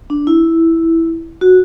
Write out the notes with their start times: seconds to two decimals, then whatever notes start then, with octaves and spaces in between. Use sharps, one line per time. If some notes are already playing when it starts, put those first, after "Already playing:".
0.10 D4
0.27 E4
1.41 F#4